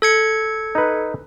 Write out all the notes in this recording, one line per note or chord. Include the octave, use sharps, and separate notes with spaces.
A4 G#6 C#7
D#4 B4